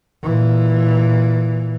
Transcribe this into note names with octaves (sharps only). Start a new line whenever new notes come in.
A#2 E3